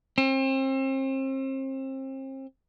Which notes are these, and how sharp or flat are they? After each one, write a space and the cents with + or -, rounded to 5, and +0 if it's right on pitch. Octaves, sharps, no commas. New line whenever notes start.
C4 +35